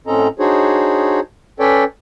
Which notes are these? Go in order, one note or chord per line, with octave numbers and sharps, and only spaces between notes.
A2 C4 C#4 A4 D#5 A#5
D4 D#4 F#4 G#4 C5 C#5
C#4 A4 B4 C#5 D5 G5